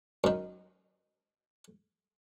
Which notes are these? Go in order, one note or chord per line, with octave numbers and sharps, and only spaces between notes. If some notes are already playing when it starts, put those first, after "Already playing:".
F#2 D#3